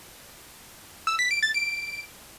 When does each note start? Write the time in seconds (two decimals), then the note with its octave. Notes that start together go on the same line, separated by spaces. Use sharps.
1.07 E6
1.19 B6
1.31 D7
1.43 A6
1.54 D7